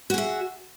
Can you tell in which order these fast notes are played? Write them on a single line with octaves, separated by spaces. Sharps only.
F#4 G#4 E5